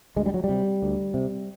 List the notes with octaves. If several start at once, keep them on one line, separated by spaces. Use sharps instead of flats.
D2 G#3
G3
F#3
G3
C3
D2
C3